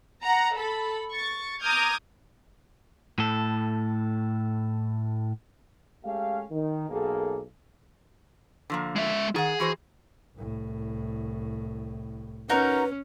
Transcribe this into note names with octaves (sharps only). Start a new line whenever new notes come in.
F#5 A#5
A4 B5
C#6 A6
A#5 D6 D#6 F6 G6 G#6
A2 A4
G#3 A3 C#4 G4 F5
D#3
B1 A#3 G#4 A4
D3 F3 A#3
G#3 E5
D#3 G#4 F#5
E3 F#4 C5
C2 A2
C#4 D#4 F#4 A#4 B4